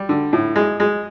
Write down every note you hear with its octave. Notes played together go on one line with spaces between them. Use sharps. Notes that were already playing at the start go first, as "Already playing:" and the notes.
Already playing: G3
D3
A2
G#3
G#3